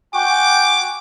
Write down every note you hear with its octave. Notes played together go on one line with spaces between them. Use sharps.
F#4 G5 G#5 D6